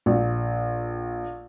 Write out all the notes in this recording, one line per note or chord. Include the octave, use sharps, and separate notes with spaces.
A#1